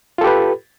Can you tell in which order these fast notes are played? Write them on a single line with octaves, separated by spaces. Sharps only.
F4 A4 G4 B4